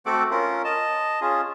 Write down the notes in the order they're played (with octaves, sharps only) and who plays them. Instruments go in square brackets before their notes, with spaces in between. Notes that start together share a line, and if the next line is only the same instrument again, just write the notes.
[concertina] A3 C4 F#4 A4 F#5 D6
C#4 F4 A#4
D#5 A5
C#4 F4 G#4